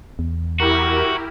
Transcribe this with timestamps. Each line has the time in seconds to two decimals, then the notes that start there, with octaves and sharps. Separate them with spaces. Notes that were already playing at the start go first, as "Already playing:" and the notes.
0.19 E2
0.60 E4 F#4 G4 A#4